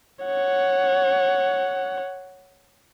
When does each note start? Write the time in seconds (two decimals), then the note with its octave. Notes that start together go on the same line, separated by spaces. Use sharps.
0.25 C#5 F#5